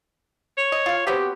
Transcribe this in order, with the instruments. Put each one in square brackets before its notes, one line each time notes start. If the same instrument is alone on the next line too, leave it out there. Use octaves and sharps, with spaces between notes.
[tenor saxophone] C#5
[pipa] D#5
F4 F5
[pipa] F#3 B3 C4 [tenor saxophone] G4